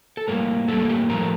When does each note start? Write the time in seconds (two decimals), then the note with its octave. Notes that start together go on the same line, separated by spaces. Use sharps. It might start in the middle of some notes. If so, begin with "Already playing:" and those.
0.17 A4
0.28 A2 G3 A#3 A#4
0.68 A2 G3 A#3 A4
0.89 G4
1.09 A2 F3 A3 A#4